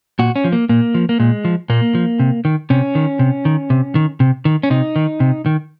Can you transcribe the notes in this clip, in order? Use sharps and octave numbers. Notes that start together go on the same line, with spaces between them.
A#2 F#4
C#4
F3
A#3
A#2 A#3
F3
A#3
A#2 G#3
F3
A#2 A#3
F3
C3
D#3
C3 C#4
D#3
C3
D#3
C3
D#3
C3
D#3
C#4
C3 D#4
D#3
C3
D#3